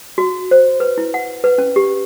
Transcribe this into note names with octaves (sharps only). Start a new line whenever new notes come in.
F#4
C5
B4
E4
F#5
B4
C#4
G4